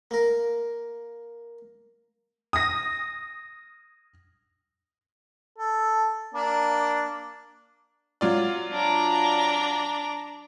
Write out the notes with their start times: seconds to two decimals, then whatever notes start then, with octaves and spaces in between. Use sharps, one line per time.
0.11 A#3 A#4
2.53 D#6 A#6
5.58 A4
6.34 A#3 D4
8.21 F#3 F4 D5
8.72 D4 A#5